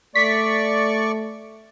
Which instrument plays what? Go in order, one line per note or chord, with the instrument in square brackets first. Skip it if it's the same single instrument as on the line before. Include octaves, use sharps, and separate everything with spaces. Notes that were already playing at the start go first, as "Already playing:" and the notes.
[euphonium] A3 [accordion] D5 C#6 [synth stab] B6